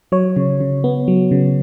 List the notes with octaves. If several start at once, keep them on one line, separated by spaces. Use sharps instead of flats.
F#3 C#5
C#3
C#3
B3
F#3
C#3